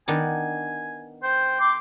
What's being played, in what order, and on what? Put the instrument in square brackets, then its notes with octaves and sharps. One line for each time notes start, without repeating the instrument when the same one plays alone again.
[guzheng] D#3 B3 D4 [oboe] G#5
[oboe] C5 [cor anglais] G5
[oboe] C6 [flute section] D6